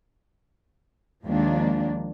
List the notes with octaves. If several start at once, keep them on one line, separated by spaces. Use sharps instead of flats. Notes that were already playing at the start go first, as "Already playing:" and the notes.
D#2 F3 G#3 A#3 D4